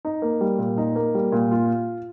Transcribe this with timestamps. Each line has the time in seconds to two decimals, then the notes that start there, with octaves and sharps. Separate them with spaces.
0.05 D#4
0.22 A#3
0.41 G3
0.59 A#2
0.78 D#4
0.96 A#3
1.15 G3
1.32 A#2
1.51 F4